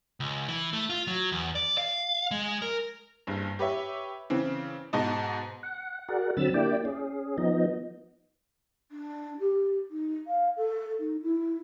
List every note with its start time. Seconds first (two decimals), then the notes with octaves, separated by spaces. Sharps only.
0.20 C#2
0.49 E3
0.73 A3
0.90 F4
1.07 F#3
1.32 E2
1.55 D5
1.78 F5
2.31 G#3
2.62 A#4
3.27 F#1 G2
3.59 G4 B4 C#5 E5
4.30 C#3 E3 C4
4.93 G#2 B2 D#5 A5
5.63 F#5
6.09 F#4 G#4 A#4 D5 F#5
6.37 D3 F#3 C4 B5 E6 A6
6.54 A#3 D4 E4 G4 D5 G5
6.85 C#4 G#4
7.38 F3 B3 D#4 D#5
8.91 D4
9.40 G4
9.91 D#4
10.27 F5
10.57 A4
10.99 D#4
11.23 E4